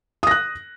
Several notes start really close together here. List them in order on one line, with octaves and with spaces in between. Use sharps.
D#6 A#6 F#6